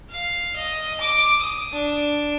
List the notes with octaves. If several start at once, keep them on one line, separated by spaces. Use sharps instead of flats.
F5
D#5
D6
D#6
D4